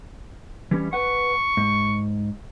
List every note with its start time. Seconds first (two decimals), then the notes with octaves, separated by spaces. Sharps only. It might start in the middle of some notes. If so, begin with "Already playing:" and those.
0.71 E3 G3 C#4
0.93 B4 F#5 C#6
1.57 G#2